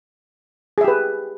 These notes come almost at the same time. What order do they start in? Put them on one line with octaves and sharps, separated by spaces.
G#4 E5 G4 B4